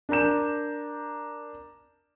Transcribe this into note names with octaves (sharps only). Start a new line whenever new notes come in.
D4 A#4 A#5 G6 E7